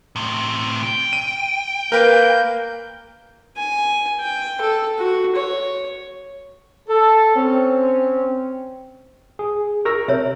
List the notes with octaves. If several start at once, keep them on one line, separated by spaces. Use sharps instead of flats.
A2 C3
G5
D#7
A#3 A#4 B4 G6
G#5
G5
A4
F#4
C#5
A4
C4 C#4
G#4
A#4 C#6 E6 A#6
C3 C#5 E5